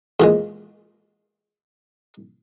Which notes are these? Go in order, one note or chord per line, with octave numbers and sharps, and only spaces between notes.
E2 A#2 G#3